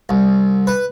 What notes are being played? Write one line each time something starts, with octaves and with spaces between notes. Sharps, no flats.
C2
B4